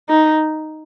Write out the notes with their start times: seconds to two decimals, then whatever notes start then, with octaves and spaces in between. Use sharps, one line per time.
0.09 D#4